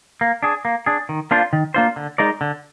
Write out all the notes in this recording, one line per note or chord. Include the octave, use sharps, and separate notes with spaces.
A#3
D4 G#4
A#3
D4 G#4
D#3
A#3 D4 F4 C5
D#3
A#3 D4 F4 C5
D3
G#3 D#4 A#4 D5
D3